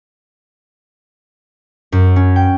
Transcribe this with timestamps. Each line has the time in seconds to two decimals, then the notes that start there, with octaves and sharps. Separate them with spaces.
1.92 F#2
2.16 C#4
2.36 G5